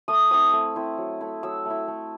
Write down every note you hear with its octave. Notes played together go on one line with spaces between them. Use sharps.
A3 D#6
C4 E4 D#6
A3
C4 E4
F#3
A3 E4
F#3 E6
A3 E4
A3